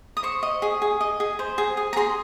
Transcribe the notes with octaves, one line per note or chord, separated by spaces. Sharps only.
D#6
C5 C#6
D#5
G#4
G#4
D#5
G#4
C5
G#4
G#4
A#5
G#4 C6